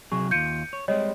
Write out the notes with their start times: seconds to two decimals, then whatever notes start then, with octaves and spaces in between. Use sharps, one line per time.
0.12 C3 F#3 G#4 C#6
0.31 D#2 F4 G6 C#7 D#7
0.73 C#5
0.88 G3 G#3 C4 C#5 D#5